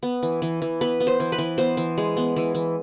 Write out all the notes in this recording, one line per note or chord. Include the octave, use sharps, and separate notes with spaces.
B3
E3
E3
E3
B3 B4
B3
C5
E3
B4
E3
B3 C5
E3
G#3
B3
E3
E3